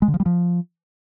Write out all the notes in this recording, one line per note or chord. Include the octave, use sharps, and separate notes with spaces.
G#3
D3
F3
G3
F3